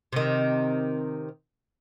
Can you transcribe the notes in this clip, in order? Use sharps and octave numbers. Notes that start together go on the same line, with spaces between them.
C3 D#3